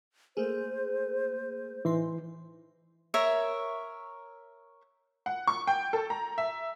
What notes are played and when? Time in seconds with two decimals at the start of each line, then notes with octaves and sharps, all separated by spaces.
0.37 A3 A#3 G#4 C5
1.85 A2 E3 D#4 C6
3.14 A#4 C#5 E5
5.26 F#5
5.47 C#6
5.67 G5
5.93 A4
6.10 A#5
6.38 E5